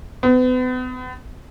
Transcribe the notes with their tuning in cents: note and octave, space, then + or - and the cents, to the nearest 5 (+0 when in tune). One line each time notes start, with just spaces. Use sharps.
B3 +40